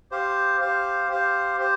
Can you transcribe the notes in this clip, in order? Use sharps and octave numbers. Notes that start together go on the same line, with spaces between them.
G4 C5 F5
G4 C5 F5
G4 C5 F5
G4 C5